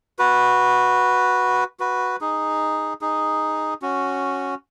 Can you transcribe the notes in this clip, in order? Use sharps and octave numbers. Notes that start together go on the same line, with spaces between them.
F#4 B4
F#4 B4
D#4 G#4
D#4 G#4
C#4 F#4